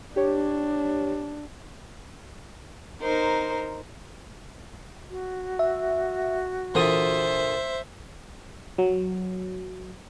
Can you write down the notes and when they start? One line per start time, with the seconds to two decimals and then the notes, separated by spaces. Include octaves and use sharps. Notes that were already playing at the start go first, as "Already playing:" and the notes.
0.16 D4 G4 C#5
3.02 D#4 A#4 C5
5.10 F#4
5.59 E5
6.75 A#2 D3 E3 C5 E5 D#6
8.78 F#3